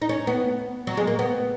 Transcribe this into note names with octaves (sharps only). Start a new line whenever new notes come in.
D#4
C#4
B3
F#3
G#3
A#3
B3